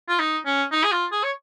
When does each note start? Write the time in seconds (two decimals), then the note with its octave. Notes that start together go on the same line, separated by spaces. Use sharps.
0.08 F4
0.19 D#4
0.46 C#4
0.72 D#4
0.84 G#4
0.92 F4
1.12 G#4
1.24 C#5